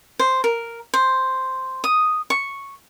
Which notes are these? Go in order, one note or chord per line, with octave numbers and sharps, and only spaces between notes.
C5
A#4
C5
D#6
C#6